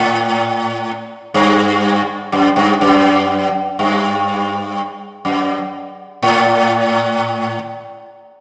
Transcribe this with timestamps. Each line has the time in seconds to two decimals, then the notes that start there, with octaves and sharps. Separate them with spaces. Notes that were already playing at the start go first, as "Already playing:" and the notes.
Already playing: A2
1.34 G2
2.32 F#2
2.56 G2
2.81 F#2
3.79 G2
5.25 F#2
6.22 A2